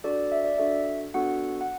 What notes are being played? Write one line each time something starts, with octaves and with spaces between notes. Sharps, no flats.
D4 F#4 A4 D5
E5
D5
D4 F#4 A4 E5
B3 D4 F#4 A4 F#5
F#5